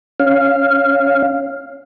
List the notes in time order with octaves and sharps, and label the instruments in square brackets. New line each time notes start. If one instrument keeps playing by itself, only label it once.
[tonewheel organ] C#4 F5